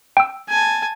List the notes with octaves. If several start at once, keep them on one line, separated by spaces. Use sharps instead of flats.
G5 E6
G#5 A5